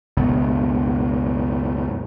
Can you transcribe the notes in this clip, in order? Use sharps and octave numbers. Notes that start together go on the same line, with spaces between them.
C#2 F#2 B2